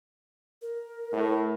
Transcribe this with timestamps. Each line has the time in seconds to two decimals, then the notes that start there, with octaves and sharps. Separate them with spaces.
0.62 A#4
1.13 A2